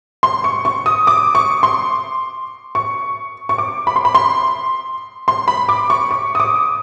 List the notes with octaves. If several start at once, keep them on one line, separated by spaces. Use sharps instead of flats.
C6
C#6
C#6
D#6
D6
C#6
C6
C#6
C#6
D6
B5
C6
B5
C6
C6
B5
D6
C#6
C#6
D#6
D6